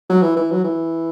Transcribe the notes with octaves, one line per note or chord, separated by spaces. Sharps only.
F#3
E3
E3
F#3
E3